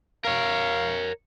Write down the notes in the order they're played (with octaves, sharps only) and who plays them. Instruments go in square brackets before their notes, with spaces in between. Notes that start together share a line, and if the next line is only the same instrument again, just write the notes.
[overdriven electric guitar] A#4 C#5 [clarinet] F5